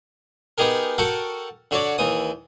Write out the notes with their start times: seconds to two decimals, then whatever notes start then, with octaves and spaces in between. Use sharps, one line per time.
0.58 B3 D#4 G4 G#4 A#4
0.98 F#4 A4 A#4 F#5 G5
1.71 D3 F#4 C#5 D5
1.98 D#2 E3 D#6